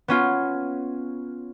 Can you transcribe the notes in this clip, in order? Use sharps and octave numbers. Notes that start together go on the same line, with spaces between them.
B3 C#4 F4